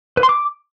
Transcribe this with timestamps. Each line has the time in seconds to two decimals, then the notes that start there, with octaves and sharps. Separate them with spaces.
0.17 B4
0.23 C6
0.29 D6